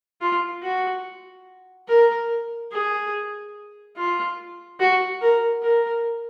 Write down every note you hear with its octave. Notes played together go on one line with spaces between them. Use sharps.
F4
F#4
A#4
G#4
F4
F#4
A#4
A#4